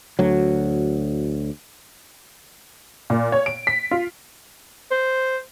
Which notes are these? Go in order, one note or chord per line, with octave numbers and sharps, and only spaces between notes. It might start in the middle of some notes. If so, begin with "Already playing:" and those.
D2 F#3
A#2
C#5
D7
B6
F4
C5